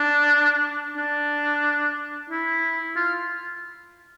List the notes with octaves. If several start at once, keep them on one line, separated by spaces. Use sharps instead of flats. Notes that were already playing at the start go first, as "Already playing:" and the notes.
Already playing: D4
D4
E4
F4